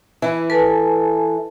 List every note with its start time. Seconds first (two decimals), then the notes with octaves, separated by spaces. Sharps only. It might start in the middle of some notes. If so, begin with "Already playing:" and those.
0.22 E3 E4 E5 B5
0.50 A4 B4 G#5 A5